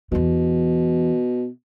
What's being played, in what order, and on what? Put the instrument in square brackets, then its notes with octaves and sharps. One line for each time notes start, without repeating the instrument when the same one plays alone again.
[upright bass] E2 E3 [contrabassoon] B2